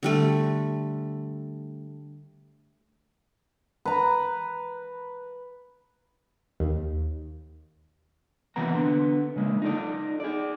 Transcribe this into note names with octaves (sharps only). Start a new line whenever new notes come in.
D3 G3 A3
B4 A#5
D#2
D#2 C3 E3 B3 F#5 A#5
D3 B3 C6
C#3 G#3 A#3
D#4 A4 D5
G#4 D5